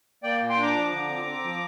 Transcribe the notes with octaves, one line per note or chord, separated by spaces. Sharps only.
A#3 D5 G5
A#2
G5 C6
D4 A#5 D6
F3
D3
C4
C4
F3